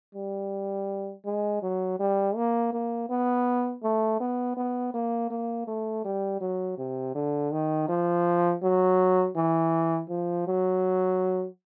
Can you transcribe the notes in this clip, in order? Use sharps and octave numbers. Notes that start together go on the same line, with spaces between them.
G3
G#3
F#3
G3
A#3
A#3
B3
A3
B3
B3
A#3
A#3
A3
G3
F#3
C3
D3
D#3
F3
F#3
E3
F3
F#3